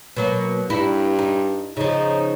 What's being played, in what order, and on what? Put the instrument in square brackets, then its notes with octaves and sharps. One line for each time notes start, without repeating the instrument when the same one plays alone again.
[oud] B2 F#3 A#3
[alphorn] G2 [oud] D#4 E4
[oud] D#4
[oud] C#3 F3 [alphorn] D#4